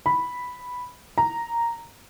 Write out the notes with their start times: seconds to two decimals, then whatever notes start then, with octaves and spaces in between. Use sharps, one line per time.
0.06 B5
1.18 A#5